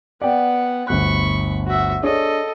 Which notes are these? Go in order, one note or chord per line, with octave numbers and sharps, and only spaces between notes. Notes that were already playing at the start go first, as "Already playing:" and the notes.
B3 D5 F#5 G5
G1 D2 B5 C#6 F#6
F#4 E5
D4 G#4 A4 C#5 D#5